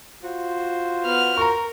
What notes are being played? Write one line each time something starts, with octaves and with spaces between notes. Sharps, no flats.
F4 F#4 C5
B3 F6
A#4 A#5 C#6